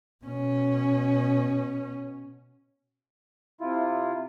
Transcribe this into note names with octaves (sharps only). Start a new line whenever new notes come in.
B2 C#4
C3 E4 F4